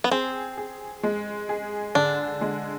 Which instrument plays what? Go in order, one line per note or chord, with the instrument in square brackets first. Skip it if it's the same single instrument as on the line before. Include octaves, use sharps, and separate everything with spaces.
[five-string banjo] B3
[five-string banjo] C4 [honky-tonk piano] G#4
[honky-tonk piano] G#4
G#3
G#4
[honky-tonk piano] D3 [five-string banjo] D4
[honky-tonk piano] G#3